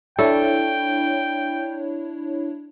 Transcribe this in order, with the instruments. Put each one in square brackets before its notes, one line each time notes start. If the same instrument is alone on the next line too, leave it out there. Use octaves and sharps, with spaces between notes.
[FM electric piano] D4 E4 C#5 [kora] A4 [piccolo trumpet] G5